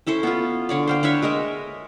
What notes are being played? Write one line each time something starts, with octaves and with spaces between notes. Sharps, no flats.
C#4 E4 A4 C5
B3 F4
D3 C#5 D5
C5 F5 G5
D4 B4 C#5 E5
G#3 A#4 D#5 E5